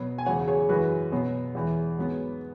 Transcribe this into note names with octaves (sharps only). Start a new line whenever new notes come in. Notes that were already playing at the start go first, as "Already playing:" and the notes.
Already playing: B2 F#3 B3
G#5
E2 C#3 F#3 C#5 F#5
G#4 C#5
F#2 E3 G#3 F#4 B4
B2 F#3 B3
E2 E3 G#3
G#2 F#3 B3